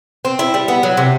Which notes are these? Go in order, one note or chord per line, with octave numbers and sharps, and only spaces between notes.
C4
E4
G3
B3
F#3
C3